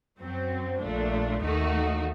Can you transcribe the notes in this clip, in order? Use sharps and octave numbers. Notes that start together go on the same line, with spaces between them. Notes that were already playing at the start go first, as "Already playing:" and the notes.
F#2 F#3 C4
A#1 A#2 A3 D4
D#2 D#3 A3 D#4 F#4